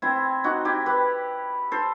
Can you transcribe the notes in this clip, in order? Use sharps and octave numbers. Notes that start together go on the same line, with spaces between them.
C4 E4
D#4 F#4
E4 G4
G4 B4
A4 C5